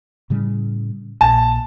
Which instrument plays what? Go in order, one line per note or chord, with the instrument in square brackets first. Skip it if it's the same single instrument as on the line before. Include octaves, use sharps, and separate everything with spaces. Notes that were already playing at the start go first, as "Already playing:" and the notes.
[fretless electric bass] A2 C#3 G3
[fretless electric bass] A#1 A#2 [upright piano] A5